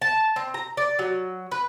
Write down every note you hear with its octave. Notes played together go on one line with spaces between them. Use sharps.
A5
C4
A#5
D5
F#3
B4